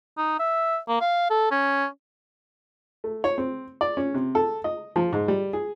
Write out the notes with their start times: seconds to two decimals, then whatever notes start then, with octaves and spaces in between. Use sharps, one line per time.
0.17 D#4
0.39 E5
0.88 A#3
1.01 F5
1.30 A4
1.51 C#4
3.04 A3
3.24 C#5
3.38 C4
3.81 D5
3.97 C#4
4.14 C3
4.35 A4
4.64 D#5
4.96 F3
5.13 G#2
5.28 G3
5.53 G#4